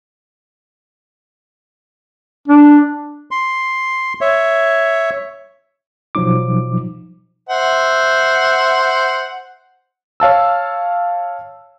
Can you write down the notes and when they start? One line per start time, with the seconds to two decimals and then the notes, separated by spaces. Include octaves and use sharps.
2.48 D4
3.31 C6
4.21 C#5 E5
6.15 B2 F3 F#3 D#4 D6
7.49 C5 E5 F#5
10.20 C#5 F5 A5 E6